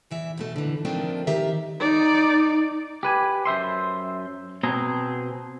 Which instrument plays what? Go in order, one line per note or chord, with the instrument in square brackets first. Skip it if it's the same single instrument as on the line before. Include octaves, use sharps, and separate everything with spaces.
[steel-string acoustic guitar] E2 E3 E5
G#2 B2 A3
D3 E3
D#3 F3 A3 A#3 C4 D4
D#3 G4 A#4 E5
[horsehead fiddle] D#4 D5
[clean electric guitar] G4 B4 G#5
F#2 C5 E5 C6
B2 C4 G#4 A#5